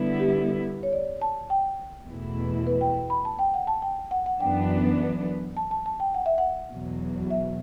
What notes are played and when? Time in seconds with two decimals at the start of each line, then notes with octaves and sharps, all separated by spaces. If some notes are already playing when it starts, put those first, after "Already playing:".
Already playing: D3 G3 B3 E4
0.20 G4
0.83 C#5
0.93 D5
1.22 A5
1.50 G5
2.08 E2 B2 A3 E4
2.67 B4
2.81 G5
3.10 B5
3.25 A5
3.39 G5
3.54 F#5
3.67 A5
3.82 G5
4.11 F#5
4.26 F#5
4.41 F#2 E3 B3 D4 G5
5.57 A5
5.71 A5
5.86 A5
6.00 G5
6.14 F#5
6.26 E5
6.38 F#5
6.72 E2 B2 F#3
7.30 E5